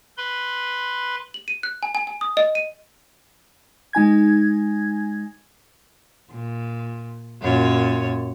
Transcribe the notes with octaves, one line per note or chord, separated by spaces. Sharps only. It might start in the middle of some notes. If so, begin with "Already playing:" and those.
B4 B5 C6
F#7
D#7
F#6
G#5
G#5
G#5
D#6
D#5
D#7
G#3 D#4 G#5 G#6
A#2
F#2 A#2 C#5